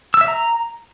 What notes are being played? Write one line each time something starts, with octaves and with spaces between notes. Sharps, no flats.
E6
E5
A#5